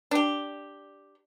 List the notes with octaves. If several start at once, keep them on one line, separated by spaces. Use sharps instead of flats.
D4 G4